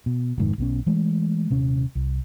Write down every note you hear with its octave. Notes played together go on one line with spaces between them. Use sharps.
B2
F1 G#2 D#3
B1 B2 C#4
E3 G#3 A3
D#1 C3 C#4
C2